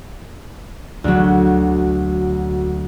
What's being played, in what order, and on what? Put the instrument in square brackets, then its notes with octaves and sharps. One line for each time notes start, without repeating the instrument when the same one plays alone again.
[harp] D2 F#3